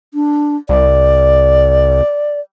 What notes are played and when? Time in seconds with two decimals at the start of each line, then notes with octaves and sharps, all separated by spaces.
0.14 D4
0.69 C2 D5